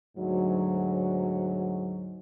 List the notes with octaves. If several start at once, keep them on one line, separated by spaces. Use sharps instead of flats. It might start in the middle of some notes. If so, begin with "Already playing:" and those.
D2 G#2 F#3